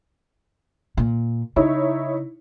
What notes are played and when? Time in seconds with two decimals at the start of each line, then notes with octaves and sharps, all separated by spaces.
0.97 A#2
1.56 C#3 D#4 E4 C#5